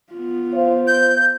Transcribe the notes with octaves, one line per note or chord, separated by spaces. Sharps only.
B3 F4
C5 F5
G6